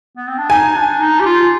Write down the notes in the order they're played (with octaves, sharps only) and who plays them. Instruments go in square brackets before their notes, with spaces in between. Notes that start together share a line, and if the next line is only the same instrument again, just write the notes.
[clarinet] B3
C4
D4
[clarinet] D#4 [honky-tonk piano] G#5
[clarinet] D4
D#4
G4
F4